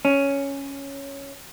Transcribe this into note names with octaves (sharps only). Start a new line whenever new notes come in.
C#4